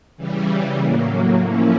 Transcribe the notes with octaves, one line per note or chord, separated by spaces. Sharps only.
C#3 E3 G3
A2 F#3 A#3
F3 A#3 C#4 E4